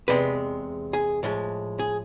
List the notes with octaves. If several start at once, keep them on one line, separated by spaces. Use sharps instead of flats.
E2 C3 G#3 B4
G#4
A2 F3 G#3
G#4